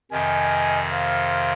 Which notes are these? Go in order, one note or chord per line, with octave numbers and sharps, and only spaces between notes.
F2 C3 D#3 D#5 G#5
C5 F5